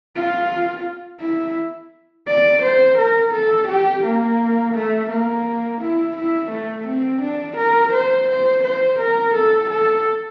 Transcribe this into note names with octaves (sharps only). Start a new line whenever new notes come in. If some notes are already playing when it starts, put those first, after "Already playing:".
F4
E4
D5
C5
A#4
A4
G4
A#3
A3
A#3
E4
E4
A3
C4
D4
A#4
C5
C5
C5
A#4
A4
A4